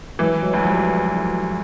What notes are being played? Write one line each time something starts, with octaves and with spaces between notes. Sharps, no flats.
E3 F#3 G#3
F#3 G#3
D2
F3 G3